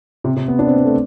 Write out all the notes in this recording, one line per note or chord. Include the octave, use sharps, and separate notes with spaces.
C3
C3
B3
D4
C4
B3
A3